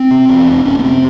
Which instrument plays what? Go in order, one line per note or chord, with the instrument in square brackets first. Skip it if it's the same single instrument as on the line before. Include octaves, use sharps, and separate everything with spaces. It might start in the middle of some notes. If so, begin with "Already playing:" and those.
Already playing: [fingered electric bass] C4
C3
E2
F1
F1 C#4
B3
C3 C4